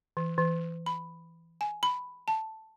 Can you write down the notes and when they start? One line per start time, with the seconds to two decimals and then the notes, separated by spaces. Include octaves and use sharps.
0.17 E3
0.38 E3
0.86 B5
1.61 G#5
1.83 B5
2.28 A5